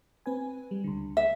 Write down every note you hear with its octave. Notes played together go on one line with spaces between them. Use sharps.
C4 B4 G#5
G3
C#2 D3
E5